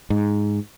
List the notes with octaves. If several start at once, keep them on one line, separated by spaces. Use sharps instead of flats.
G#2